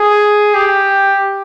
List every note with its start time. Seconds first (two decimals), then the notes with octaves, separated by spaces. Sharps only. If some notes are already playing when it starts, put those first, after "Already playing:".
Already playing: G#4
0.54 G4